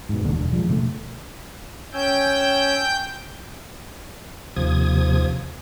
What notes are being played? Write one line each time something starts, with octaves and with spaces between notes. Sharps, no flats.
G#2 B2
G1 D#2 D3
E1 D4
F3 G#3
B2 D3 G3 A3
C#4 G5 G#5 E6 G6
D#2 C3 F3 D#6 G#6